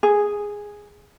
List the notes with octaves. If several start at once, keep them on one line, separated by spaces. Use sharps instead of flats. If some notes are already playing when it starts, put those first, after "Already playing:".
G#4